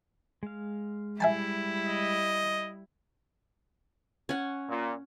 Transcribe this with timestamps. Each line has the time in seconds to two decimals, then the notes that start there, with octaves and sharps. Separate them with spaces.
0.43 G#3 F5
1.20 G3 E4 E5 G#5 A5
1.88 D#5
4.29 C#4 F#5
4.69 A#2